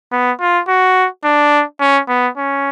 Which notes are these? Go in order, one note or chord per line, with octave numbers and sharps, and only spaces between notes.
B3
F4
F#4
D4
C#4
B3
C#4